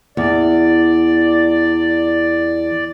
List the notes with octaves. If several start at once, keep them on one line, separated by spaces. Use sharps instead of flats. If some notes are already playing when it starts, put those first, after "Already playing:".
E2 D5